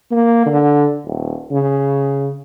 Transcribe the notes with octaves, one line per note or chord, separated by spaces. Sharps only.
A#3
D3
D#1
C#3